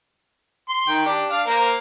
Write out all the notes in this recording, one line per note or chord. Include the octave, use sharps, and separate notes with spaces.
C6
D#3 G5
D4 G4
D4 F5
A#3 A#4 C5